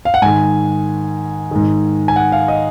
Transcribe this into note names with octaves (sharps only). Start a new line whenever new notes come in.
F5
F#5
G#2 D#3 G#5
G#2 D#3
G#5
F#5
F5
D#5